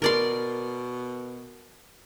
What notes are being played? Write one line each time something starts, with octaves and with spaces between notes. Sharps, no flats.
B2 A#4 D5 C6